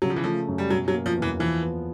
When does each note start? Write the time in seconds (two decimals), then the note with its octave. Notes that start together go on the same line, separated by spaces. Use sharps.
0.02 C#3 F#3
0.10 F3
0.16 E3
0.24 F3 A3
0.48 F#2
0.58 G3
0.70 B2 F#3
0.88 F#3
0.94 A#3
1.06 F3
1.17 E2 E3
1.39 E3 F3
1.63 B3